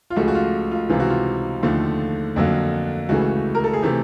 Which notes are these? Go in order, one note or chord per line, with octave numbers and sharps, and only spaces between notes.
F4
C#2 C#3 F3 A3 F#4
F#4
F4
F4
C#2 C3 E3 F4
F#4
F4
D#2 D3 F3 A3
F2 D3 F#3 A#3
C#2 C#3 E3 A3 F#4
A#4
A4
G#4
C3 E3 A3 G4